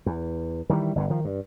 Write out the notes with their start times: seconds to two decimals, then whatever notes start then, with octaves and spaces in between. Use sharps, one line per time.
0.06 E2
0.70 D#3 E3 F#3 G3
0.96 G1 G2 A#2 D3
1.10 D#3 F3
1.25 G2